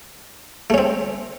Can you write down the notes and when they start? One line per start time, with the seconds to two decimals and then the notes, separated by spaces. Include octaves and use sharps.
0.70 A3
0.74 C#4
0.78 C4